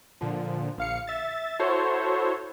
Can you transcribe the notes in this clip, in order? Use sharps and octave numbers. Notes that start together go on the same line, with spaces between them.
A#2 D3 F3
A#1 F5 C#7
E5 A6
E4 F#4 A4 C5 C#5